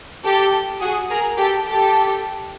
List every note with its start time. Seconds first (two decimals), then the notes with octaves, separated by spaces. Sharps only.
0.25 G4 A4
0.81 F#4 G#4
1.10 G#4 A#4
1.37 G4 A4
1.66 G4 A4